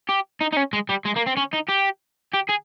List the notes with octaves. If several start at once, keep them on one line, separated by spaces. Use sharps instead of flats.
G4
D#4
D#4
C#4
G#3
G3
G#3
A#3
C4
C#4
D#4
G4
G4
G#4